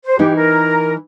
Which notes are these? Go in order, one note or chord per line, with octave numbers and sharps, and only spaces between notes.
C5
E3 D#4 G4
A#4